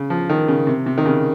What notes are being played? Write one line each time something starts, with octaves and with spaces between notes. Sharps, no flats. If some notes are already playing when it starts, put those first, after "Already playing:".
Already playing: C#3
F3
D#3
C#3
C3
C3
D#3
C#3